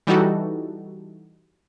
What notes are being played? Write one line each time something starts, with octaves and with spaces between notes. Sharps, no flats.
E3 G3 D#4 F#4 A4